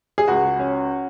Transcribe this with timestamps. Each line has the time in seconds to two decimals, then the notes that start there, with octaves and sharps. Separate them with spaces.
0.18 G#4
0.28 C#2 F#4
0.59 C#4